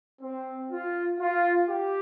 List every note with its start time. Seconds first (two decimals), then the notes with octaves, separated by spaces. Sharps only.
0.22 C4
0.71 F4
1.20 F4
1.69 G4